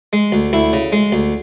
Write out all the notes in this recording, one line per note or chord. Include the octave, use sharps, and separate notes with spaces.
G#3
D2
D2 E4
C#3
G#3
D2